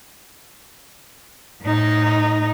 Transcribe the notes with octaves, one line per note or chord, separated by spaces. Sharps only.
A2 D#4